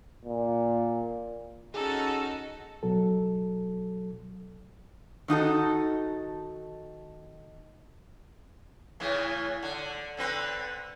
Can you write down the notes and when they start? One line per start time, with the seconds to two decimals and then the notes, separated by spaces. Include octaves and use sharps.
0.25 A#2
1.74 C#4 D#4 F#4 G#4 A4
2.83 B2 F#3 A4
5.28 D#3 D#4 F#4 A4
9.00 A2 C#3 E3
9.62 D3
10.17 D3 C4 B4